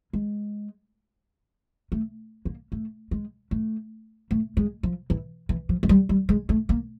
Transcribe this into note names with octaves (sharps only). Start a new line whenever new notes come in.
G#3
A3
A#3
A3
G#3
A3
A3
G#3
F3
E3
E3
F3
G#3
G3
G3
G#3
A3
A#3